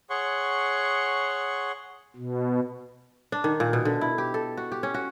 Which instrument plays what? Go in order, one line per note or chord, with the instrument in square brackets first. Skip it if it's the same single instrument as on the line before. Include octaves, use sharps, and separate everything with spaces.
[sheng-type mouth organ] G#4 C#5 F#5 C6 C#6
[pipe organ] B2
[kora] D4
D#3
A#2
B2
D3
E4
G4
A4
F#4
G4
C#4
F#4